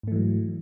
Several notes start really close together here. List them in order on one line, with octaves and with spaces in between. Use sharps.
G#2 A3 E3 F#3